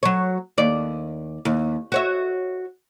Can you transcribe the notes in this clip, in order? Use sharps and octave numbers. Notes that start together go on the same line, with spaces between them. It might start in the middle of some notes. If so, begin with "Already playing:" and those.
F#3 C#5
D#2 D5
D#2
F#4 C#5 E5